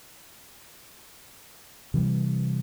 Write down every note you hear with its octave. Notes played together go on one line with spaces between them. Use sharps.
C3 E3 G3